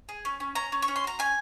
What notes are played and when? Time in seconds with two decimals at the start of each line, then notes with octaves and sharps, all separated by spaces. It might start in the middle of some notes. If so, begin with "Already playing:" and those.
0.09 G#4
0.25 C#4
0.40 C#4
0.55 C#4 A#5
0.72 C#4
0.82 C#6
0.88 C#4
0.96 C6
1.04 F#4 A#5
1.19 C#4 G#5